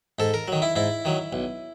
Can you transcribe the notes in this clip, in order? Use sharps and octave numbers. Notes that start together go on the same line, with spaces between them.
G#2 A4
A#4
D#3 F#3
E4
G#2 E4
D#3 F#3
B1